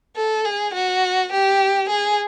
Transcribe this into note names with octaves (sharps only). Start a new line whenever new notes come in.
A4
G#4
F#4
G4
G#4